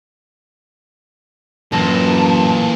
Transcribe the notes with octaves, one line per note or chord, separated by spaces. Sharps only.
A1 F#2 A#2 A4 A5 A#6